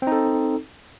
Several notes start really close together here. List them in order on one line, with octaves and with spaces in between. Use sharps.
C4 D#4 A4